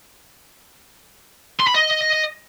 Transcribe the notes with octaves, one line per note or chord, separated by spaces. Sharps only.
C6
B5
D#5